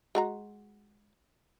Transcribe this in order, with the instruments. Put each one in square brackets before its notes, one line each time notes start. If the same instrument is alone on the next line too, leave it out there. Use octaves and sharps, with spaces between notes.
[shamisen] G#3 F#4 A#5